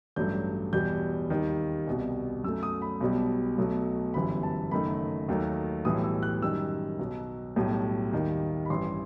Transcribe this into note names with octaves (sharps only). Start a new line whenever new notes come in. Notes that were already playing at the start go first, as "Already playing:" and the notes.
A1 G2 F#3 A3 G6
E2 B2 G3 G6
D#2 D#3 G3
C2 B2 G3
F#2 F#3 A3 E6
D#6
B5
B1 B2 G3
B1 B2 F#3 A3
G1 F#2 E3 G3 B5
A5
F#1 F#2 D#3 A3 B5
D#2 D#3 F#3 A3
B1 A2 E3 G3 D#6
E6
F#6
F#2 D#3 G3 E6
B1 B2 F#3
B1 A2 G3
D#2 D#3 G3
B5
A1 G2 E3 C6